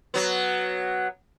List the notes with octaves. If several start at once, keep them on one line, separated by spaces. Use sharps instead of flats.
F#3 B3